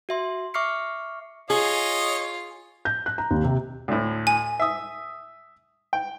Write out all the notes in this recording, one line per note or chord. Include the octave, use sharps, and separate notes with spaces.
F#4 E5 C6
E5 C#6 D6 F6 C7 C#7
F4 G#4 C#5 D#5
G6
F#6
A#5
D#2
C3
D2 A2
G#5
E5 D#6
G5